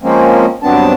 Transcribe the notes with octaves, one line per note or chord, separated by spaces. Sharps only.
F3 G#3 A#3 C4 C#4
G2 F#3 B3 C4 D4 A5